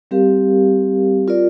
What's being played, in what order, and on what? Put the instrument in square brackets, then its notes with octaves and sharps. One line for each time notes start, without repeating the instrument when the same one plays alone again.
[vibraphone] G3 C4 G4 A#4 F5
F4 A#4 D5